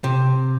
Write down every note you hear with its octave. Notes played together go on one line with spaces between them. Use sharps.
C3